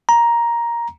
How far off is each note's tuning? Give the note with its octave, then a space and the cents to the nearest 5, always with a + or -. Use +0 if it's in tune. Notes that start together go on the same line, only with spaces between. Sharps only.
A#5 +10